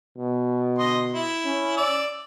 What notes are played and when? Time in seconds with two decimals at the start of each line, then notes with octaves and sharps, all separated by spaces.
0.18 B2
0.78 D3 D#5 C6
1.12 E4
1.45 C#4
1.77 D5 E6